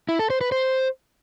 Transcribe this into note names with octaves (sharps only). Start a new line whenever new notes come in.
E4
A4
C5
B4
C5